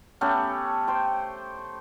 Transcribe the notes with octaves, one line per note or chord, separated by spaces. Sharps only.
A3 B3 C#4 G4
C5 G5